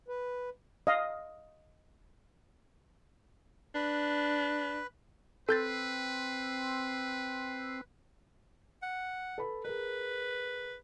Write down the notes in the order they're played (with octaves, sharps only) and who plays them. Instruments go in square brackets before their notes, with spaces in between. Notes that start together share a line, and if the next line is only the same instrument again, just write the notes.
[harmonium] B4
[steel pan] D#5 F5
[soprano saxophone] D4 [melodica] B4
[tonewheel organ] C4 [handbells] A4 G6 A6 [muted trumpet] B4
[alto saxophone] F#5
[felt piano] A4 B4 B5
[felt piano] G#4 A#4 [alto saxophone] B4